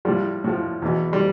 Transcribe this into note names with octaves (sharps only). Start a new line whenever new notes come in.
A2 F3 G3
A2 F3
E2 B2
G3